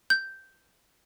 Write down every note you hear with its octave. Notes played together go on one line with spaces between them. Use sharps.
G6